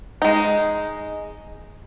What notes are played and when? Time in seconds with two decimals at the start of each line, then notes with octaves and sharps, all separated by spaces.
0.22 G#3 D#4